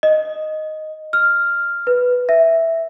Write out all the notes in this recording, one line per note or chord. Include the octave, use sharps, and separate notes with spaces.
D#5
F6
B4
E5